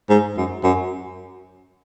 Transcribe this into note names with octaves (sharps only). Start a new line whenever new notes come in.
G#2
F#2
F#2